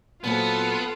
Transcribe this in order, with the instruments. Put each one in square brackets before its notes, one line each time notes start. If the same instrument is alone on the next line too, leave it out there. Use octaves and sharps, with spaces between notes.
[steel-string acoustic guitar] A#2 F#3 C4 [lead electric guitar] B3 [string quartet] F4 A4